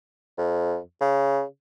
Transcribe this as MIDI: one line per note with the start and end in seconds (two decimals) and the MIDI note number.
0.38 0.78 41
1.01 1.43 49